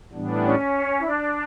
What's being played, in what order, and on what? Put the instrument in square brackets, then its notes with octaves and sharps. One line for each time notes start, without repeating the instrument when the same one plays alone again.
[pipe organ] A2 E3 G3 B3 D4
[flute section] C#4
E4
D4